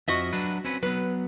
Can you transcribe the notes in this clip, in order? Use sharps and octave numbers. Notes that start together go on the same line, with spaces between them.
F2 F3 F#4 D#5 E5
F#3 D4 B4
C4 C#4 B4
F#3 B3 B4